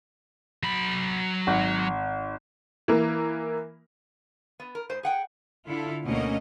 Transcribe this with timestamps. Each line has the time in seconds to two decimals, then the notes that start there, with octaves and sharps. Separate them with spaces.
0.63 F#3 B5
1.47 G#1
2.88 E3 A#3
4.60 B3
4.75 A#4
4.89 G#2 C5
5.03 G#4 F#5 G5
5.67 D3 E4 F4 A4
6.05 D2 B2 A3 A#3 C#4 D#5